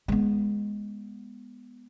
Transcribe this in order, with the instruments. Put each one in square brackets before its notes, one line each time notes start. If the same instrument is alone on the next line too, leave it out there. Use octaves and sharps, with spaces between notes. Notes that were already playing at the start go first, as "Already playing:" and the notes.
[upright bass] G#3 B3